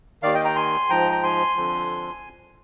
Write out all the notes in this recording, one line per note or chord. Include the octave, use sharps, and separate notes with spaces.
D#2 D#3 D5 F5
D#5 G5
G5 A#5
G#5 C6
G#2 F3 G5 A#5
A#5
G#5 C6
F2 D3 F3